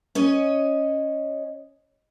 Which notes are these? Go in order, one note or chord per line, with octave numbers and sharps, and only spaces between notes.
C#4 C#5 D#5